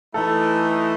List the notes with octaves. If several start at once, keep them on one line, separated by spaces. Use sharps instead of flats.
E3 A3 D#4 A4